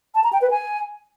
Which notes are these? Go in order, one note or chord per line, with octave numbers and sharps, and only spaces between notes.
A5
A#5
G5
B4
G#5